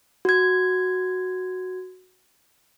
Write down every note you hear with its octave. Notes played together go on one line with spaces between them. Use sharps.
F#4 G#6